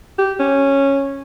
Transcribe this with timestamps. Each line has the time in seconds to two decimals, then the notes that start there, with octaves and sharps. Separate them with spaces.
0.18 G4
0.39 C#4